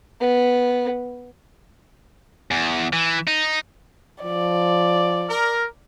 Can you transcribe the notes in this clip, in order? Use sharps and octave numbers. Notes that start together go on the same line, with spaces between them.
B3
E2
E3
D#4
F3 D5
A#4